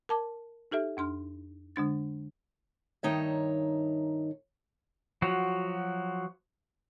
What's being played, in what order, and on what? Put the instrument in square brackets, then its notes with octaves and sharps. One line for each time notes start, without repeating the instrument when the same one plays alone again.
[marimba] A#4 A5 D6
D#4 G4 A4 E5
F2 D4 C6 F6
D3 G#3 D4 A6
[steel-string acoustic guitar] G2 D#3 D#4 C#5 E5
[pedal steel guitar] F3 F#3 F#4